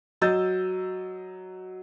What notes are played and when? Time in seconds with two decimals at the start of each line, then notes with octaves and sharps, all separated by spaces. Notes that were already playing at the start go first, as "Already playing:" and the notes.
0.21 F#3 D#5 E6 G6 A6